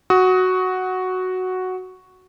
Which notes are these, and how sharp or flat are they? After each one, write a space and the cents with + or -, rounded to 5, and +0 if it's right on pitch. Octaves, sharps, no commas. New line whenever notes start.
F#4 +0 D#6 +30